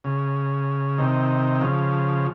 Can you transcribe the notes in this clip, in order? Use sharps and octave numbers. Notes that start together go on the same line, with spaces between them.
C#3
C3 D#3
C#3 F3